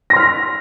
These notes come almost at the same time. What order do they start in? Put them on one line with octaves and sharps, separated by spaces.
A#6 C6 F6 B6